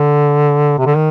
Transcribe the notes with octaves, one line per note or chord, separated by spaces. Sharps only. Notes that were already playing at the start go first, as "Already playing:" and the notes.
Already playing: D3
C3
D3
D#3